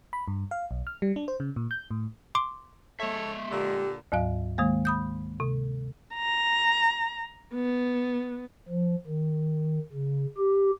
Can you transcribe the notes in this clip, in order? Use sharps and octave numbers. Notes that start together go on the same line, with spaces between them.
B5
G2
F5
B1
F6
G3
D4
C5
C#3
A#2
G6
A2
C6 D6
G#3 A4 C#5 E5
A#2 D3 G4
D2 G#2 F#3 F5
D#3 G#3 A#3
B5 D#6 G6
C3
A#5
B3
F3
D#3
C#3
G4